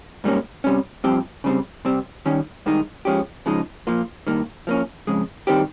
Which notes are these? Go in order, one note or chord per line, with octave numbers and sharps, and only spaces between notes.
G#2 G3 A#3 C#4
C3 G3 C#4
G2 F3 C4 G4
C#3 G3 C4
C3 G3 C4
D#3 G3 C#4
G2 D#3 G#3 D#4
F3 G#3 C#4 G4
C#3 F3 G#3 D#4
A#2 F3 A#3 F4
G2 D#3 A#3
F3 A#3 C#4
F2 C#3 G#3
D#3 G3 C4 G4